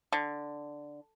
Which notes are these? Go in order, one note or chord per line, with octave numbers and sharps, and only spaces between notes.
D3